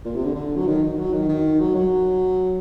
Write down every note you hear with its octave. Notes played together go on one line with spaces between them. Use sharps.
A#2
C3
D3
D3
F#3
D#3
D#3
F#3
D#3
D#3
F#3
F#3